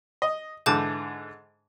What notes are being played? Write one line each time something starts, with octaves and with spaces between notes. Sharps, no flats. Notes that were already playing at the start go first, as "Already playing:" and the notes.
D#5
G#2 D3 E3 A5 D6 G6